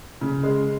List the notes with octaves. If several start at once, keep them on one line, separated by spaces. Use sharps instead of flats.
C#3
G#3